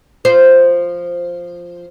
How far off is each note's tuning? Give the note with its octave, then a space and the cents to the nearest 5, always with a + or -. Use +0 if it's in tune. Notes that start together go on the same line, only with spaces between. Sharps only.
F3 +0 C5 +0